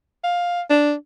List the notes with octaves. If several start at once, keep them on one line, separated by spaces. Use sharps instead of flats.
F5
D4